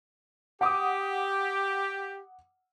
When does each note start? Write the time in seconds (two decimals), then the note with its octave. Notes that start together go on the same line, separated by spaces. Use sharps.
0.61 G4 F#5 D6 D#6